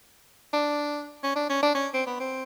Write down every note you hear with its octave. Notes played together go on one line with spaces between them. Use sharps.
D4
C#4
D4
C#4
D4
C#4
C4
B3
C4